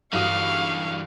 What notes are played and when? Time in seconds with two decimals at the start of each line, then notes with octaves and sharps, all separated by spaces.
0.13 G2 D3 E3 F#4 F5 C#6 D#6